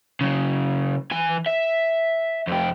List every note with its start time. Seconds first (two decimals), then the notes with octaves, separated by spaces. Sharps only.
0.21 C#3 F#3
1.11 E3 G#5
1.46 E5
2.48 F2 G4